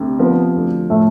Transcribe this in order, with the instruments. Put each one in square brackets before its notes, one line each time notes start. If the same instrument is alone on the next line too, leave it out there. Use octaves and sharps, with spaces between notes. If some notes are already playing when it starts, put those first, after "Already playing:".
Already playing: [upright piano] D2 C3
[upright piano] F3 [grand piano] B3
[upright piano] D2
[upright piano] A2 [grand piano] A3